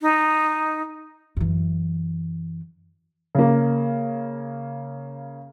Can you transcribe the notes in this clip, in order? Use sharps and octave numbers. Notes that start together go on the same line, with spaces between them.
D#4
F#2 E3
C#3 A#3